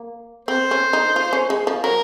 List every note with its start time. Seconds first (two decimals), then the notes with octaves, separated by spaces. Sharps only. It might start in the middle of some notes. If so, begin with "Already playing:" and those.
Already playing: A#3
0.48 C4 C5
0.71 C#4
0.93 D#4
1.16 F4
1.33 C#4
1.50 G#3
1.67 F3
1.84 F#3 A#4